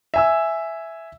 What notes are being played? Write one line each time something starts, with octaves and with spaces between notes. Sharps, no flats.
E5 G#5 E6